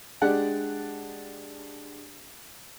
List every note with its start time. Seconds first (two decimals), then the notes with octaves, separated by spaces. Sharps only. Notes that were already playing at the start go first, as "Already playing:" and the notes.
0.22 G#3 D4 G4 D5 F#5